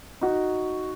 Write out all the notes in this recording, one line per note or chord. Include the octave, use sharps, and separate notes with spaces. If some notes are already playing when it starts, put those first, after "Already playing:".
D#4 F#4